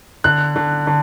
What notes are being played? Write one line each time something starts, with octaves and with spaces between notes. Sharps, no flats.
D3 F#6
D3
D3